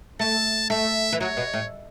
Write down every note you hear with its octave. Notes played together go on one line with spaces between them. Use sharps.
A3 A5
A3 E5
E3
F#3 C#5
B2
A2